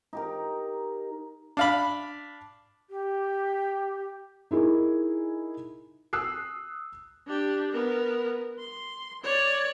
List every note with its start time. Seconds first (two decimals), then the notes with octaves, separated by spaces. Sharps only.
0.13 D#4 G4 A#4
1.57 D4 F5 B5
2.90 G4
4.51 D#4 E4 G#4 A#4
6.13 D#6 E6 F#6 C7
7.27 D4 G4
7.72 B3 A#4
8.59 C6
9.24 C#5 D5